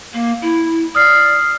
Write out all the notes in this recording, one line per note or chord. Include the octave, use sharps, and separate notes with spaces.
A#3
E4
D5 D#6 F6 C7